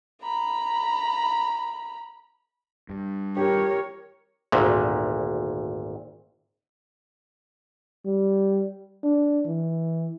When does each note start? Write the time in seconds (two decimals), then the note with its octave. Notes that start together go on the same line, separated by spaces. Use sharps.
0.21 A#5 B5
2.89 G2
3.37 G4 A#4 C#5
4.52 G#1 D2 A#2
8.06 G3
9.04 D4
9.46 E3